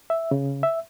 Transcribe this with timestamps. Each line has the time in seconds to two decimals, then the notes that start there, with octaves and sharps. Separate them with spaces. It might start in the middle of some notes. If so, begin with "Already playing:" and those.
0.10 E5
0.31 C#3
0.63 E5